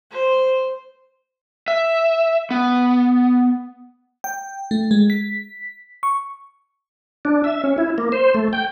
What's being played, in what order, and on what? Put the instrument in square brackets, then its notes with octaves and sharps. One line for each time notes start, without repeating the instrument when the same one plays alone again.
[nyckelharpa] C5
[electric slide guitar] E5
B3
[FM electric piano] G5
A3
G#3
B6
C#6
[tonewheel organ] D4
E5
C#4
E4
A#3
C5
A3
G5